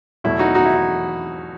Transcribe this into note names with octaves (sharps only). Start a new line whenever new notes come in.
E2 B2 F#3 A3 E4
D#4 F#4
D#4 F#4
E4
E4